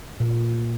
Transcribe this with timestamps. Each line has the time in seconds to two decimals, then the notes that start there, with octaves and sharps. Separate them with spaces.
0.20 A#2